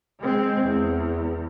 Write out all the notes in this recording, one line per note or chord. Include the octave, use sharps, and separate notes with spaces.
G#3 C4
E2